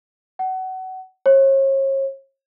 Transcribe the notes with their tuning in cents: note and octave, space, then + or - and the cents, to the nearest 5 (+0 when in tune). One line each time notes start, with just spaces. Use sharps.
F#5 +25
C#5 -40